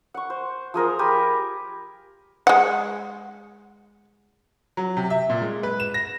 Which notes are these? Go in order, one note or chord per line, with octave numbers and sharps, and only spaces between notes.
F#5 C#6
C5
F3 G#4 A#4 C5
G4 A#4 G#5 B5
G#3 F#5
F#3
C3
E5
A#2
G#3
B4
E7
A#6